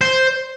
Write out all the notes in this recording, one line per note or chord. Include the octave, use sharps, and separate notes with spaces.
C5